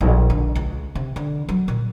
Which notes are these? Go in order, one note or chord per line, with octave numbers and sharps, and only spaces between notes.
A#1
D3
C#2
C3
D3
F#3
A#2